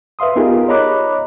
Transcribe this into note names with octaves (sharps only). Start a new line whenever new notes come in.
B4 E5 F5 C6 D#6
B3 D#4 F4 G4 G#4 A#4
C#5 D#5 A#5 B5 D6 F#6